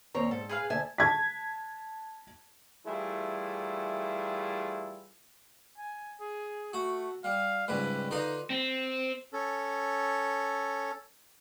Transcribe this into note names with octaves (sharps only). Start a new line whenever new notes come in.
D#2 C4 C#5 A#5
G#2 A4
G#4 B4 F5
D2 A4 E5 G#5
A5 G#6 B6
E3 G3 A3 E4 F4 G#4
G#5
G#4
A3 F#4
G3 F5
C#2 G#2 G3 B4
D3 D#4 F4 B4
C4
C#4 A4